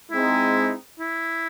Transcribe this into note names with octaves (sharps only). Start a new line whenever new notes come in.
G#3 C4 D#4 E4
E4